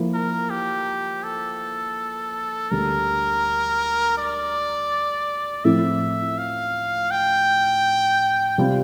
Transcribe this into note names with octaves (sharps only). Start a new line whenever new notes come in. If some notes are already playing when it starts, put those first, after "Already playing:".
Already playing: F3 A#3 E4
A#4
G4
A4
D2 D3 G3 A#4
D5
A2 F3 C4 E4 E5
F5
G5
C3 G3 C4 F4